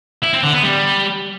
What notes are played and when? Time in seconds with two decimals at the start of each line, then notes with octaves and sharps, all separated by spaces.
0.23 E4
0.33 C4
0.43 D3
0.53 B3
0.63 G3